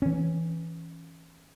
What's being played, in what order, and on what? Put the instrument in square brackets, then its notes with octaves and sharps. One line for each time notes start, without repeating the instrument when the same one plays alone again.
[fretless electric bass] E3 C#4